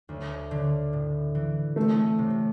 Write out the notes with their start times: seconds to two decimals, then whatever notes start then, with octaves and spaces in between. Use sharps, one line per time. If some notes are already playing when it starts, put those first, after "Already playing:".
0.09 D2
0.51 D3
0.93 A2
1.35 E3
1.76 A3 C4
2.19 C3